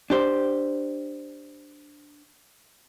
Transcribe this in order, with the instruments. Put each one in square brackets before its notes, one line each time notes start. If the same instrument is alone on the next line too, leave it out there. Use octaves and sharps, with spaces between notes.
[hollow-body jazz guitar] D4 G4 C5